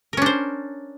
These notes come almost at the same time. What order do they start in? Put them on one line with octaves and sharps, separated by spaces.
A#4 C#4 D4 C5